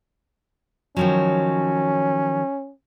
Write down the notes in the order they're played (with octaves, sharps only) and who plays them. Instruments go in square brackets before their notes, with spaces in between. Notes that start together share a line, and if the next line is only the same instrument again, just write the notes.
[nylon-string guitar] D#3 F3 F#3 [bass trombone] C#4